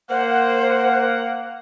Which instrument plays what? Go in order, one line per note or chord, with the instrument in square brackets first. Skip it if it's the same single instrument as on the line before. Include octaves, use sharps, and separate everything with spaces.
[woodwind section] A#3 F#5 [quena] C5